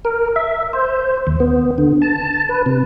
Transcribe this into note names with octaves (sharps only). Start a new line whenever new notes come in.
A#4
E5
C5
D#2
B3
D3
A5
B4
C3